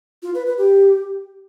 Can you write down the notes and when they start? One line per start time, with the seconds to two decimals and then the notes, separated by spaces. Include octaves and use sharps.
0.23 F4
0.34 B4
0.46 B4
0.58 G4